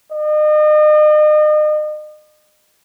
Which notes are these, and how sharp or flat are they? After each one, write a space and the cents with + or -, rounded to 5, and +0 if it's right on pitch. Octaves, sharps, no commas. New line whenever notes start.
D#5 -35